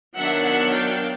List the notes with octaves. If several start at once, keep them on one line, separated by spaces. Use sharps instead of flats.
D#3 F#3 B3 D4 E5 F#5
E5 F#5
F5 G5